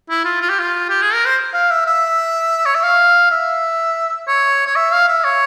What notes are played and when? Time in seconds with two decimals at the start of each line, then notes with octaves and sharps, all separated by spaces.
0.10 E4
0.24 F4
0.41 F4
0.49 G4
0.59 F4
0.89 G4
1.02 G#4
1.13 A#4
1.25 C5
1.54 F5
1.70 E5
1.86 E5
2.66 C#5
2.75 E5
2.83 F5
3.31 E5
4.27 C#5
4.67 C#5
4.76 E5
4.92 F5
5.08 E5
5.24 C#5